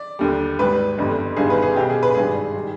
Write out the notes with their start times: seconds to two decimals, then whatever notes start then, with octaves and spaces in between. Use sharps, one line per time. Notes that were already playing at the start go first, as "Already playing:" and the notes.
Already playing: D5
0.19 D#2 D3 G3
0.59 G#1 G#2 G3 B4
0.98 G1 F2 D3 G3
1.36 G1 G2 D#3 G3 G#4
1.50 B4
1.62 G#4
1.75 B1 B2 G3 G4
1.90 G#4
2.03 B4
2.15 G#1 G2 D#3 G3 G#4
2.55 D#3 G3